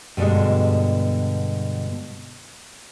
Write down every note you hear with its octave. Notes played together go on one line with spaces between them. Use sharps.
G2 B2 D3 G3 G#3